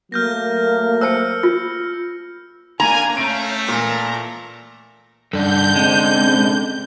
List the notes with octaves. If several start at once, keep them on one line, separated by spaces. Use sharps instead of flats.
F#3 A3 A#3 F6 G6 A#6
A#4 C5 A5 E6 C#7
F4
A#3 D4 G#5 A#5
A3 C#4 F5 G6 D7
A#2 E3 A#4 A5
G2 C#4 D4 A4 G6
G#3 C4